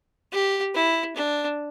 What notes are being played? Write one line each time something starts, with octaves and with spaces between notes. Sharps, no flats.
G4
E4
D4